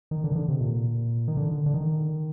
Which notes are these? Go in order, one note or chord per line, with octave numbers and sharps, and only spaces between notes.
D#3
D3
D#3
D3
C3
A#2
D#3
D3
D3
D#3